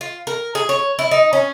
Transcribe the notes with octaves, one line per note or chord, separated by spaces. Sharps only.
F4
A#4
G#4
C#5
E4
D#4
C#4